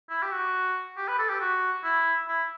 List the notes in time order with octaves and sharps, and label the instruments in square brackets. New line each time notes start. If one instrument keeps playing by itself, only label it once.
[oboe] E4
G4
F#4
G4
B4
A4
G4
F#4
E4
E4